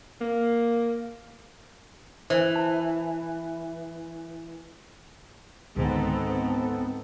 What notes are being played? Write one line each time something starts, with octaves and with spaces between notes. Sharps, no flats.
A#3
E3 C5
A5
C#2 G#2 D3 D#3 B3 C4 A4